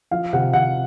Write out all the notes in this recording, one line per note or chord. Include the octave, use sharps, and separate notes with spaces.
F3 F5
C3 F#5
C3 F#5